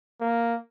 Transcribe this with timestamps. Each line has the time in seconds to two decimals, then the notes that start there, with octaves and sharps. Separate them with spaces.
0.21 A#3